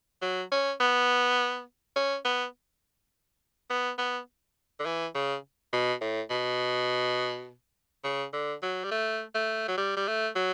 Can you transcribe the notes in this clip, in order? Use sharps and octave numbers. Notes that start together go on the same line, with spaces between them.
F#3
C#4
B3
C#4
B3
B3
B3
D3
E3
C#3
B2
A2
B2
C#3
D3
F#3
G3
A3
A3
F#3
G3
G3
A3
F#3